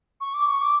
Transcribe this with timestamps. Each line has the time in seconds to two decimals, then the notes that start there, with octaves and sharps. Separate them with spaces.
0.20 C#6
0.34 D6
0.47 C#6
0.61 D6